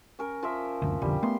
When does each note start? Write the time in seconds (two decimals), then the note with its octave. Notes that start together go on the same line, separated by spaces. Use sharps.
0.19 C#4 A#4
0.43 F3 A#4 E5
0.82 F#1 D2
1.02 B1 F2 D3 G3
1.23 A3 B3 C6